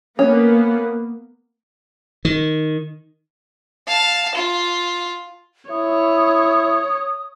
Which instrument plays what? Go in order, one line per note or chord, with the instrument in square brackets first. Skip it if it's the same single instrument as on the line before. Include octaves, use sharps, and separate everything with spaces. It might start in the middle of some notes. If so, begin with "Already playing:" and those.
[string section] A#3 B3 [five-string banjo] C#4
[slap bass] D#3
[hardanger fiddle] F5 A5
F4
[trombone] E4 [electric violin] C#5 [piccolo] D#6